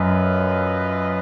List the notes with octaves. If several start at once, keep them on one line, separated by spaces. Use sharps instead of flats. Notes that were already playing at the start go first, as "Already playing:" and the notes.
Already playing: F#2 F4 B4 D#5